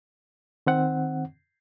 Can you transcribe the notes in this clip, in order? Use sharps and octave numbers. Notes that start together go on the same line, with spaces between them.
D#3 C4 F#5